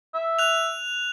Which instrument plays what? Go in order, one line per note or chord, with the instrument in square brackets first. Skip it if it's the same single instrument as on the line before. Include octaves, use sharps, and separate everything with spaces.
[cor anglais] E5
[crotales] F#6 F7